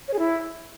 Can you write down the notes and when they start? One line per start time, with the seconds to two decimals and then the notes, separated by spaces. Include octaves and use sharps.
0.08 C#5
0.13 G#4
0.19 E4